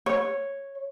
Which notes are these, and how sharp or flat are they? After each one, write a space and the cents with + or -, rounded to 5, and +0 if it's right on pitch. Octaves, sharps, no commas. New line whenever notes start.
C#5 -5